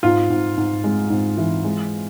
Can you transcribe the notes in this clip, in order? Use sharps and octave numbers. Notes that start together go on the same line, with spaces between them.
G#2 F4
G#2
G#2
G#3
G#2
E3
G#3